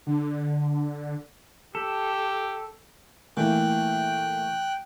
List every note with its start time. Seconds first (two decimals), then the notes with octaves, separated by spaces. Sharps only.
0.07 D3
1.75 G4 A4
3.37 A#2 E3 A3 G5 F#6